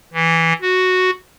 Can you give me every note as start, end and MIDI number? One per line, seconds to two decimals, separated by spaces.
0.13 0.53 52
0.62 1.10 66